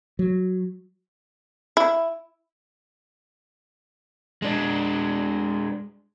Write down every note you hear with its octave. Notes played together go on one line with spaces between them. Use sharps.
F#3
E4
G#3 D4